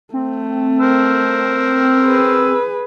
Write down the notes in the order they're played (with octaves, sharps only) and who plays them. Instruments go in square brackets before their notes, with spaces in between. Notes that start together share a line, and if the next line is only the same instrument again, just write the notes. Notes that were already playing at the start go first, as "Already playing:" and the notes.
[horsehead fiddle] A3 [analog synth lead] C4
[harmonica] A#4 C5 E6
[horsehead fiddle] G#4 B4